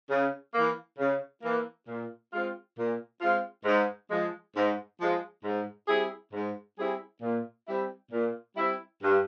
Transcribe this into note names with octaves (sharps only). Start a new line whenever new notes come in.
C#3
E3 A#3
C#3
E3 A#3
A#2
G#3 C4 F4
A#2
G#3 C4 F4
G#2
F3 G#3
G#2
F3 G#3
G#2
G3 C4 E4 G#4
G#2
G3 C4 E4 G#4
A#2
G3 C4 E4
A#2
G3 C4 E4
G2